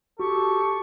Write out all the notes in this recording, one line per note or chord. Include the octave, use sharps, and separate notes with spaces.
F#4 G4 A4 C#6